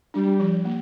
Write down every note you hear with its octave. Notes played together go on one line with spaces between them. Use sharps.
G3 D4
F3
A#3